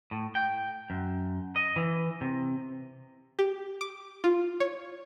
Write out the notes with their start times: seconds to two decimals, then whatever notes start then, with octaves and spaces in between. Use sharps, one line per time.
0.11 A2
0.35 G5
0.90 F#2
1.56 D#5
1.76 E3
2.21 C3
3.39 G4
3.81 D6
4.24 F4
4.60 C#5